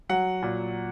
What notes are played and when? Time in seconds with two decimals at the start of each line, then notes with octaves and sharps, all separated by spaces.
0.09 F#3 F#5
0.43 A#2